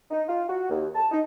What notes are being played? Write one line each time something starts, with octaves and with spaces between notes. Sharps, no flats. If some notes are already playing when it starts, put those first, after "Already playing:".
D#4
F4
F#4
D#2
A5
D#4